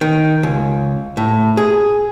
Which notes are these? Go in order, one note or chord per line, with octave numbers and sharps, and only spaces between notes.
D#3
C#2
A2
G#4